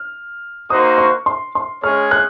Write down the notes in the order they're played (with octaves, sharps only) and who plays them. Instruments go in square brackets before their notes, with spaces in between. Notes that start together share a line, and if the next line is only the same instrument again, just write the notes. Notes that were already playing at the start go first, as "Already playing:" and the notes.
Already playing: [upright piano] F6
[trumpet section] A#3 D#4 F#4 C5 [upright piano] D#6
[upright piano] C#6
C6
C6
[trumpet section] G#3 C#4 G#4 C#5 [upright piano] F6
[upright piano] F#6